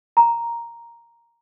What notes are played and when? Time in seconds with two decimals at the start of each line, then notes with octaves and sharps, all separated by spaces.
0.17 A#5